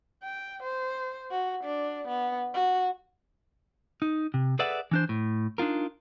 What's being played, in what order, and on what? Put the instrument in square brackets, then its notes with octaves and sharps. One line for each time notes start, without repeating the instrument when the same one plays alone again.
[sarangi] G5
C5
F#4
D4
B3
F#4
[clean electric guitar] D#4
C3
G#4 A4 B4 D5 E5 F#5
E3 D4 C5
A2
D4 D#4 F4 A#4